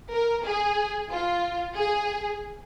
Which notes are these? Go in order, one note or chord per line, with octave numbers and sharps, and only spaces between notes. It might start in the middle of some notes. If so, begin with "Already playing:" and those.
A#4
G#4
F4
G#4